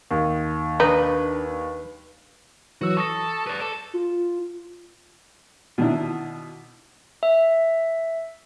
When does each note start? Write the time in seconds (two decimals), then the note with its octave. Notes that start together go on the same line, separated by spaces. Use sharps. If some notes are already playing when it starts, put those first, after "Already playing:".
0.11 D#2
0.80 D4 D#4 B4
2.81 E3 F#3 F#4 E6
2.97 A4 C#6 D#6 A#6
3.47 B4 D5
3.61 A4
3.94 F4
5.78 B2 D#3 D4 E4
7.23 E5